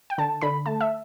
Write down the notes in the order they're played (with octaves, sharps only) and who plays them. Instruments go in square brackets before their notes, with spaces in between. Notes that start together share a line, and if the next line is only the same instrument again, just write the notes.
[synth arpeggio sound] G5
D3 A5
D3 B5
A3 A5
E5